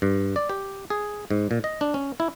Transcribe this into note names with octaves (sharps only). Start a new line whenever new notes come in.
G2
D5
G4
G#4
G#2
A#2
D#5
D4
C#4
E4